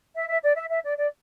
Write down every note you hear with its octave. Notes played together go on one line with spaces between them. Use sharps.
E5
E5
D5
E5
E5
D5
D5